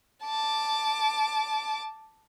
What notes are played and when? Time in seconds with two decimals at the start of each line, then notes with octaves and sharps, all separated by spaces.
0.24 A5 D6